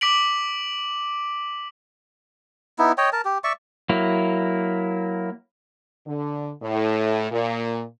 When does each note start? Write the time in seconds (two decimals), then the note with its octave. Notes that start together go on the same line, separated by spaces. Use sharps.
0.01 D6 B6 D7 F#7
2.79 B3 D#4 E4
2.98 C#5 D#5 G5
3.13 A#4 A5
3.25 G4
3.44 D5 E5 C#6
3.89 F#3 A#3 E4
6.06 D3
6.62 A2
7.31 A#2